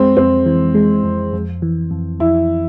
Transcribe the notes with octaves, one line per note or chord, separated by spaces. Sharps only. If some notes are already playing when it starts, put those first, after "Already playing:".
Already playing: F2 G#3 C4
F2 C4
E3
G#3
F2
F2
E3
F2
F2 E4